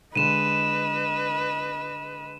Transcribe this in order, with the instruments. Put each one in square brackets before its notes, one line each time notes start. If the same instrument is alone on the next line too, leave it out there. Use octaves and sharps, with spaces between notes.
[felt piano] D3 G#3 [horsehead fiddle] B4 D#5 [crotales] D#7 E7